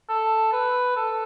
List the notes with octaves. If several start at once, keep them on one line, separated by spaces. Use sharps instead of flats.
A4
B4
A4